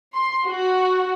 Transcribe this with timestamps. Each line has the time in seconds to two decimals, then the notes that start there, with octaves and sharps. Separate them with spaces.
0.14 C6
0.47 F#4